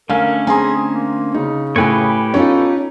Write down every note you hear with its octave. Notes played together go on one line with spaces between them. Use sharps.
D3 A3 C#4 A#4 F5
C4 G#4 G#5 A#5 C6
A#3
C#3 D#4
A2 G4 A4 B4 C#5 G5 G#5
B3 C#4 D#4 F4 A4